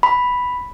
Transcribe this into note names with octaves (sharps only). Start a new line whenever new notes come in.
B5